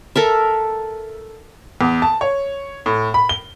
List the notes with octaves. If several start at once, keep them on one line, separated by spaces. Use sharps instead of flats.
A4 A#4 E5
E2
A5
C#5
A2
B5
G7